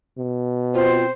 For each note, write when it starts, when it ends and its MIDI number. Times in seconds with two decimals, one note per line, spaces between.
0.18 1.10 47
0.75 1.07 60
0.75 1.05 65
0.75 1.11 72